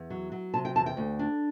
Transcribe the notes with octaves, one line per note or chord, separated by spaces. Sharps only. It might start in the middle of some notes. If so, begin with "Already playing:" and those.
Already playing: E2
F#3
F#3
C3 A5
G5
E2 A5
G5
D2
D4